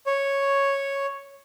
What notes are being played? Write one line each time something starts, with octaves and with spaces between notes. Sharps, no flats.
C#5